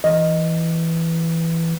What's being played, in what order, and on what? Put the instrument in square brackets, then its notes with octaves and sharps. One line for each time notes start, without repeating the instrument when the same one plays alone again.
[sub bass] E3 [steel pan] D#5